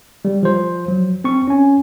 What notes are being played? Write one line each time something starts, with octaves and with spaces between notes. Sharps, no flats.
G3
F3 C5
F#3
C4 C#6
C#4 G#5